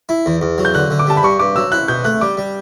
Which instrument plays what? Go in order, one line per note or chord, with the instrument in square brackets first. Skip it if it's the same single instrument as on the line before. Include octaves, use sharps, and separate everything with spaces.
[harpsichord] E4
E2
E2
F#3
[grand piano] G6
[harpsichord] D3 [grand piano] F#6
[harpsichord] D3
[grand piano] D6
[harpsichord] G3 [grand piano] A5
[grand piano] B5
[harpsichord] G2 [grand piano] C#6
[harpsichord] G2 [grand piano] D6
[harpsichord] F#3 [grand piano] E6
[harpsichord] E4 [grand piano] F#6
[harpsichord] B2 [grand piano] G6
[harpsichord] A3 [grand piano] F#6
[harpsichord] G3 [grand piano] D6
[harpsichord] G3